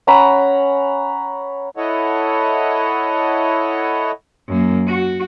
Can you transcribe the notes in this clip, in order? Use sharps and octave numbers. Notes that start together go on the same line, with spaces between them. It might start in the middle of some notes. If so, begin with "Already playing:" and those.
C#4 F#5 A#5 B5
E4 A4 C#5 D#5 F#5
F#2 A#3
F#4